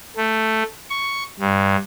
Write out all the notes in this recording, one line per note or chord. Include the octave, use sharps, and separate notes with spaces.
A3
C#6
G2